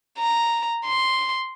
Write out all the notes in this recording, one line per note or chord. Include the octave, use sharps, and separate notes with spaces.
A#5
C6